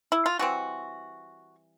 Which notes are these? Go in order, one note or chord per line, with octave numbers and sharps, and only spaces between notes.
E4
F4
E3 G3 C4 F#4